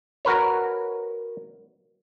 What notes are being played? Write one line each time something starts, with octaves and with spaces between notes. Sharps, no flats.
F#4 A#4 B4 C#5